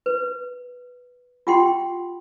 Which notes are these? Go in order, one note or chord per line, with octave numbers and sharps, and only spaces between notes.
B4
F4 G4 F#5 G5 C6